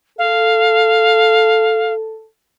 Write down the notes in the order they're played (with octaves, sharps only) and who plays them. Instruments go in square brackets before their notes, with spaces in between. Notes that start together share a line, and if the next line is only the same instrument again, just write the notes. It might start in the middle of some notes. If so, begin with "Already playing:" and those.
[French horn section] A4 [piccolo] F5